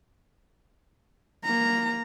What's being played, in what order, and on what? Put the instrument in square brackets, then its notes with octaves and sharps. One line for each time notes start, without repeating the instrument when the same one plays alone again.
[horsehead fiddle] A#3 A#5